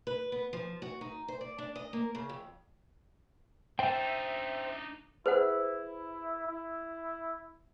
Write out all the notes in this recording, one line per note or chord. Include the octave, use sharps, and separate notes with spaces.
B4
B3
F3
F#4
D#4
C5
D5
D4
D#5
A#3
C#3
F2
D4 D#4 C5 E5 G5
E4 G#4 B4 C5 F#5
E4